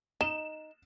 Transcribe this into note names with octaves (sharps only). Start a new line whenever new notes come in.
D#4 E7